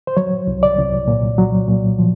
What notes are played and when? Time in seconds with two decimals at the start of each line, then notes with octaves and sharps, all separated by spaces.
0.07 C5
0.17 F#3 C#5
0.47 C2
0.63 D5
0.77 C2
1.08 A#2
1.38 F#3
1.68 A#2
1.99 F3